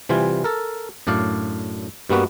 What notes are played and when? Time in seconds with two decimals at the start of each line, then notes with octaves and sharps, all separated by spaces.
0.09 C3 E3 G3 F4 G#5
0.44 A4 A#4
1.07 F#2 A2 D4 D5 F5
2.09 G2 G3 A#3 B3 F#4 B4